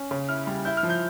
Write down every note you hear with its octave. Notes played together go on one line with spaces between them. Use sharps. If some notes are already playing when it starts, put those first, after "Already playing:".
Already playing: C#4
C#3
E4 F6
G3
E4 G6
F6
F3
G6